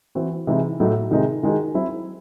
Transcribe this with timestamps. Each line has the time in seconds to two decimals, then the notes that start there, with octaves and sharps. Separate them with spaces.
0.15 E3 C4 F#4
0.47 C3 E3 G#3 D#4
0.80 A2 F#3 A3 D#4 F#4
1.11 C3 D#3 G#3 D#4
1.43 D#3 G#3 D#4 F#4
1.74 F#3 C4 E4